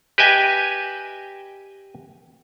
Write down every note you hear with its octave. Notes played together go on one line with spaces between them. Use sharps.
G4 B4 D#5 E5 G5 G#5